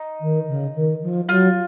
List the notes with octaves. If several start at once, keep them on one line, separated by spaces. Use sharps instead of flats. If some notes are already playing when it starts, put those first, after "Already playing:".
Already playing: D#4
D#3
C#3
D#3
F3
F#3 F4